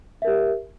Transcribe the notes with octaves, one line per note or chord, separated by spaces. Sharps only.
G4 A#4 E5